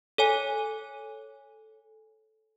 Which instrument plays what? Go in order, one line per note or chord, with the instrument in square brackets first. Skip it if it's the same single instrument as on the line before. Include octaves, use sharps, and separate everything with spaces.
[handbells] A4 C#5 G#5